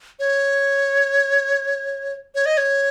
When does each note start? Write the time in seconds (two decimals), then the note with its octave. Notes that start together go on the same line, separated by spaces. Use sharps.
0.19 C#5
2.35 C#5
2.46 D#5
2.57 C#5